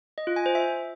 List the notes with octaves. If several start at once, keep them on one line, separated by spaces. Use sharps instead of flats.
D#5
F4
G#5
C5
E5